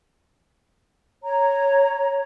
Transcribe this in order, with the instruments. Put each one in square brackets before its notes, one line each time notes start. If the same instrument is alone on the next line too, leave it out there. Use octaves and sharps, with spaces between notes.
[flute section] C#5 A#5